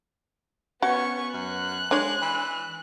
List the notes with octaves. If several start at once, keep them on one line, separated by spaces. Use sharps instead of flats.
B3 C#4 F#4 F#5 C#6
F#2 F#6
G#3 D4 C#5
E3